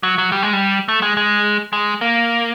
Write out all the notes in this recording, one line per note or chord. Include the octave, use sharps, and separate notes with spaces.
F#3
F#3
G3
G#3
G3
A3
G#3
G#3
G#3
A#3